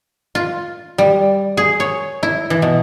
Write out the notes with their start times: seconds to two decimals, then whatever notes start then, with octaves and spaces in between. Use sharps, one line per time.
0.35 F4
0.98 G3
1.57 G#4
1.80 C#5
2.23 E4
2.50 E3
2.62 B2